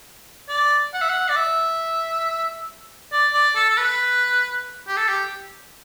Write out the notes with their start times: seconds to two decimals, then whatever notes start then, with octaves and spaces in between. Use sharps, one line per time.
0.49 D5
0.94 F#5
1.02 E5
1.09 F#5
1.29 D5
1.36 E5
3.12 D5
3.33 D5
3.55 A4
3.70 A4
3.78 B4
4.88 G4
4.97 A4
5.08 G4